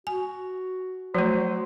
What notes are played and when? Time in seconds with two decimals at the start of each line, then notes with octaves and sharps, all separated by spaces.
0.07 F#4 G#5
1.15 F3 F#3 A3 C5